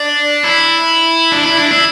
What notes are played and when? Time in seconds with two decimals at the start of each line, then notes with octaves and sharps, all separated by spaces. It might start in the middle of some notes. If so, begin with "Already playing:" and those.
Already playing: D4
0.44 E4
1.32 D4
1.44 E4
1.57 D4
1.71 E4